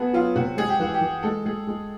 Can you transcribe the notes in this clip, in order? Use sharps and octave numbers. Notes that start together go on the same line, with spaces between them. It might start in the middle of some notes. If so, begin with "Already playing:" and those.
Already playing: B3 F#4 G#4 A4
F#3 F4
C3 F#4
G#3 G#4
G4
E3 F#4
G4
E3
G#3 A4
G#3 G#4
G#3